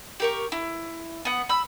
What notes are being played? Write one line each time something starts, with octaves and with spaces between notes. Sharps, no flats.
G4 A#4 C#6
E4
B3 F#5
B5 E6